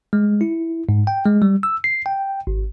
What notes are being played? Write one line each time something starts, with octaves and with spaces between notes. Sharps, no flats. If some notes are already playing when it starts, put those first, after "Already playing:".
G#3
E4
G#2
G5
G#3
G3
E6
C7
G5
G#1